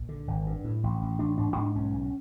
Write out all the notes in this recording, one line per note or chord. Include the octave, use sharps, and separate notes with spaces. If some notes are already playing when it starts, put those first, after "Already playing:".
Already playing: A#1
D3
G#1
G2
A2
A1
A1
A1 D4
G#2 D4
G#2 D4
B1 C#4
B1